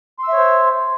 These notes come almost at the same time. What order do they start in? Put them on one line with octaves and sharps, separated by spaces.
C6 E6 E5 C#5 C5